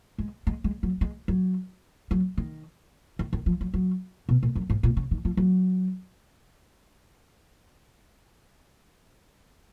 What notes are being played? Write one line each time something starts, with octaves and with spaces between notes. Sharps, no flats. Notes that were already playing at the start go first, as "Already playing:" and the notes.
G#3
G#3
G#3
F#3
G#3
F#3
F#3
D#3
D#3
D#3
F3
F#3
F#3
B2
A#2
F#2
G#2
A#2
C#3
D#3
F3
F#3